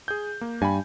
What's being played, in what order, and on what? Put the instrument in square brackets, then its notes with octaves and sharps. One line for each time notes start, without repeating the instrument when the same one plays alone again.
[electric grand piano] G#4 G6
A#3
[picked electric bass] G2 [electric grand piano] G#5 B5